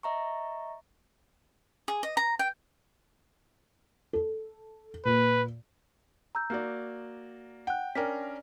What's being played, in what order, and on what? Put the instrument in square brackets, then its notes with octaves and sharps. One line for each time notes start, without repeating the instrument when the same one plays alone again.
[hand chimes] D#5 E5 A#5 C#6
[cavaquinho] G#4
D#5
A#5
G5
[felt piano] A4
[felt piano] A#2 [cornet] B4
[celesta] A#5 E6 G6
[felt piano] A#3 F#4 D5
[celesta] F#5 F#6 [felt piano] G5
[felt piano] C#4 D4 A#4 [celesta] G5 B6